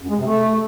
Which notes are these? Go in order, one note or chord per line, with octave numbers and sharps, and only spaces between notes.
F#2
G#3
C3
A3